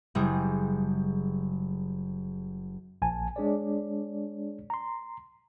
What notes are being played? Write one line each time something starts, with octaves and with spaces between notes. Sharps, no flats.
F#1 G3 G#4
A#1 G#5 A5
G#3 D4 G#4 C#5 D5
A#5 C6